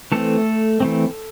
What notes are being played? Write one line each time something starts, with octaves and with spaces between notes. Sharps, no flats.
E3 A3 C4 A4
E3 A3 C4